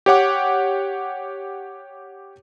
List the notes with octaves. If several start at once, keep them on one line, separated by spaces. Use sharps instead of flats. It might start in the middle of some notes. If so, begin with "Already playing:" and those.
G4 C#5 F#5 D6